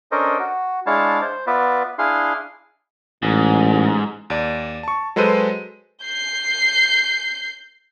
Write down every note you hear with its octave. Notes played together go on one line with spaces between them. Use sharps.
C#4 D4 A4 A#4 C5 D#5
F#4
G#3 D4 E4 C#5 F5 A5
C5
B3 F4 B4 D5 E5
D4 E4 G#4 F5 C6
A1 G#2
D#2 D5
A5 C#6
F#3 G#3 A4 B4 C5 D#7
G6 C7